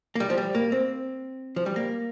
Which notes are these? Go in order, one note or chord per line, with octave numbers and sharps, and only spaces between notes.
A#3
G3
F3
G3
A#3
C4
F3
G3
A#3